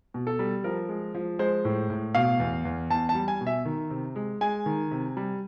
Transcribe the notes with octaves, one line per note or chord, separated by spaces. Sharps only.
B2
A4
G3
F3 A#4
G#3
F3
G#3 C5
A2
A2
B2 F5
E2
E2
E2 A5
A5
G3
G#5
B2
E5
D#3
C3
G#3
G#3 G#5
D#3
C3
G3